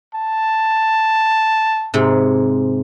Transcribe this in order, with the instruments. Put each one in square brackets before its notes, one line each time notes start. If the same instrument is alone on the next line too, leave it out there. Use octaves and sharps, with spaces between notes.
[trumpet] A5
[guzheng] G#2 C3